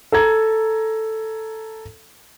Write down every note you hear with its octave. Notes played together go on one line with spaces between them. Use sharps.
A4 A#5 G#6